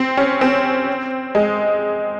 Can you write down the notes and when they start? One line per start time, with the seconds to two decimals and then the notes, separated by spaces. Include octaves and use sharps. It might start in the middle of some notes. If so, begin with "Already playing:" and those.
Already playing: C4
0.17 C#4
0.41 C4
1.35 G#3